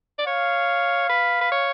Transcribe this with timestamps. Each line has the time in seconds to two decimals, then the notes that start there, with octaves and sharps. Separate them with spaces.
0.18 D5
0.26 C#5 F5
1.10 B4
1.41 B4
1.52 C#5